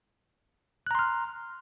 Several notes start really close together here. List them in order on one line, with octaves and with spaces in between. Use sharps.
F#6 A#5 C6 F6